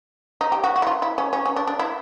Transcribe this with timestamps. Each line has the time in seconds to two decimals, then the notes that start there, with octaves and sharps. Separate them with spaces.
0.41 D#4
0.52 G4
0.64 F#4
0.76 F#4
0.82 E4
0.87 F4
1.02 E4
1.18 C#4
1.33 C#4
1.46 C#4
1.56 D4
1.67 D4
1.79 E4